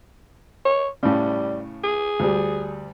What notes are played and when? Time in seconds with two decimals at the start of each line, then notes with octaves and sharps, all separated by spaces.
0.65 C#5
1.03 A2 C#3 G3
1.84 G#4
2.20 D2 G3